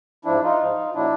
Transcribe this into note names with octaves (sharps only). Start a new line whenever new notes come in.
G#2 F3 D4 E4
D#4 F4
G#2 F3
B2 F#3 D4 E4